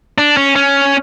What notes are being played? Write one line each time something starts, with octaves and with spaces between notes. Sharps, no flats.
D4
C#4
C#4